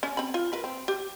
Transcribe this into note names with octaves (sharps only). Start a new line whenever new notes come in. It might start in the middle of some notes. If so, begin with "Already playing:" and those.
C#4
C4 B5
F4
A#4 B4
C4
G4